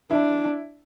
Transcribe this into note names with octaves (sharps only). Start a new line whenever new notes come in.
D4 E4